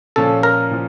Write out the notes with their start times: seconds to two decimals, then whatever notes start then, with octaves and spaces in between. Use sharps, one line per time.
0.16 A#2 F3 C#4 A4
0.43 A#4
0.71 A#2 F3